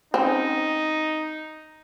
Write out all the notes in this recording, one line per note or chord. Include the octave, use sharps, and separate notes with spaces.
C4 C#4 D#4